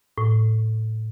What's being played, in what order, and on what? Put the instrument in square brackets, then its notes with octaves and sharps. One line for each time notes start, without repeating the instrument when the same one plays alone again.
[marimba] A2